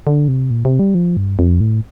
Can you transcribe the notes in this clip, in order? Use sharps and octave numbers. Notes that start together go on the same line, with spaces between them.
D3
C3
A#2
C3
G3
F3
G2
F2
A2